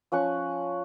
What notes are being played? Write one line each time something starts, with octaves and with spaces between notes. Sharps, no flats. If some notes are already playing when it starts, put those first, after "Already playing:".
F3 C#4 F#5 C#6